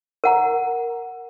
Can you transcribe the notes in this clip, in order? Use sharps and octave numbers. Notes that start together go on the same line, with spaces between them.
A#4 F#5 A#5